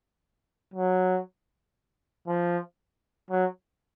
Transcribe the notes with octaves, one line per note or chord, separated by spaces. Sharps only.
F#3
F3
F#3